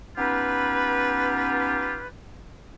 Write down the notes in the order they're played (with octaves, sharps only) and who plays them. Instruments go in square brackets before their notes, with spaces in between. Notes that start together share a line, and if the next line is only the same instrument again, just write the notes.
[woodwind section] B3 C#4 D#4 F4 G4 B4